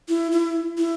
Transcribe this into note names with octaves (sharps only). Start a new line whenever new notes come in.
E4
E4
E4